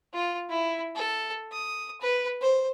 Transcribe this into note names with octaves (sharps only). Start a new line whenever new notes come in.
F4
E4
A4
D#6
B4
C5